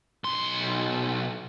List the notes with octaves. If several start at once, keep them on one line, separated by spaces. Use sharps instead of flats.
B1 C6